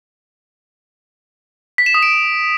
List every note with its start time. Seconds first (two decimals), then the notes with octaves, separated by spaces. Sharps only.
1.78 B6
1.86 E7
1.94 D#6
2.03 D7